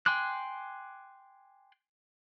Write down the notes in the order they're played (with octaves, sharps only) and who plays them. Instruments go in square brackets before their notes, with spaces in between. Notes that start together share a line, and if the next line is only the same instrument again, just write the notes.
[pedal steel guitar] G5 G#5 C6 D6 F#6